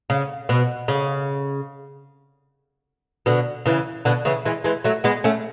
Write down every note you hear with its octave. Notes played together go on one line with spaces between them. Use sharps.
C#3
B2
C#3
B2 D3
C#3 E3
B2 D3
C#3 E3
E3 G#3
E3 G#3
F#3 A3
G#3 B3
A3 C#4